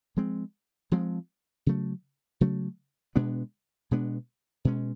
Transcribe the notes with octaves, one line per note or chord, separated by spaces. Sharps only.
F3 G#3 C4
F3 G#3 C4
C#3 F#3 A3
C#3 F#3 A3
B2 G#3 B3 D4
B2 G#3 B3 D4
B2 G#3 C#4